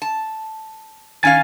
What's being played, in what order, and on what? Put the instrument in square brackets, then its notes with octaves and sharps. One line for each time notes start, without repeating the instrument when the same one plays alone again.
[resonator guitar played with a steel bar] A5
[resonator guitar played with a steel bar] D#3 C#4 F5 [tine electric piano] G#5 A6